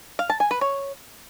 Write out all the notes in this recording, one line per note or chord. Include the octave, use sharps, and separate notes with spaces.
F5
A5
G#5
B4
C#5